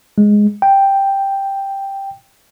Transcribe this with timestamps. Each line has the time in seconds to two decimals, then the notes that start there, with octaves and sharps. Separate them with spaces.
0.18 G#3
0.62 G5